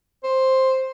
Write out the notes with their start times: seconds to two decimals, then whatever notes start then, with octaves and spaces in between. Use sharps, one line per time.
0.23 C5